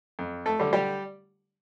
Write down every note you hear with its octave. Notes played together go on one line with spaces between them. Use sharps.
F2
A3 A4
D3 G3
G3 G4